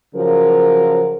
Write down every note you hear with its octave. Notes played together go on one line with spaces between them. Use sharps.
C#3 F3 F#3 A#4